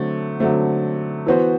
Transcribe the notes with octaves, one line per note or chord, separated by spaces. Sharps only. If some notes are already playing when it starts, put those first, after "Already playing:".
Already playing: D3 F#3 A3 C4
D3 F#3 A3 C4
E3 B3 F#4 C5